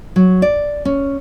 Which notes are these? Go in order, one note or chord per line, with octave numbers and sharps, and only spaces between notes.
F#3
D5
C#4